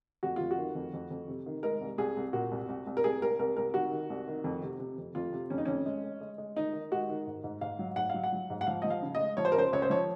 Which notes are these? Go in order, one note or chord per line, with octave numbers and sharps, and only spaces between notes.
F2 F#4
F2 F4
F#4
D#3
F2
F2
F2
C3
D#3
G#3 A#4
C2
C2 G#4
C2
A#2 F#4
C2
C2
C2
A#4
C2 G#4
C2 A#4
C2 A#4
C2 A#4
D#3 F#4
D#3
C2
D#3
F2
C3
C3
F2
F2 F4
C3
F2 C#4
D#4
F2 C#4
G#3
G#3
G#3
G#3
D#3 D#4
D#3
G#3 F#4
D#3
G#2
G#2
G#2 F5
F#3
G#2 F#5
F#3 F5
F#5
F#3
G#2
F#5
F3 F5
F3 D#5
F5
C#3
D#5
G#3
F3 C#5
C5
A#4
C#2 C5
C#2 C#5
C5
F3 C#5